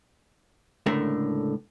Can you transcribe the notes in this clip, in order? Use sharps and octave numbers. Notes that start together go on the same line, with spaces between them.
C#2 A2 D3 A3 A#4 E5